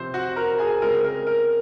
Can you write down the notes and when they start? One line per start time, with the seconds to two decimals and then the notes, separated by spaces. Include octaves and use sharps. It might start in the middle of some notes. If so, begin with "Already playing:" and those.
Already playing: C3 F3 C4 C5
0.14 F#4 F#5
0.36 A#4 A#5
0.59 G#4 G#5
0.82 C#3 G#3 C4 A#4
1.04 A#4
1.27 A#4